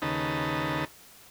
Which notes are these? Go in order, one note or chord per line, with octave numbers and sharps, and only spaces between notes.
D#2 C#3 D#4 B4 A5